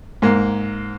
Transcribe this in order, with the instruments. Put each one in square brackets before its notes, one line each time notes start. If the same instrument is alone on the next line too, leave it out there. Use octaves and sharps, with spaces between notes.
[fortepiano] G#2 A#3